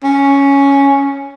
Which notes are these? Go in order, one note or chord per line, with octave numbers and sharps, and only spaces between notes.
C#4